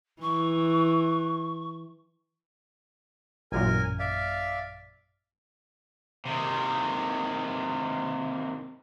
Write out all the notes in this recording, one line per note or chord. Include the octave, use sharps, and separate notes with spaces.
E3 C#6
A1 F#2 A#2 A#4 G#5
D5 E5 F5
C3 D#3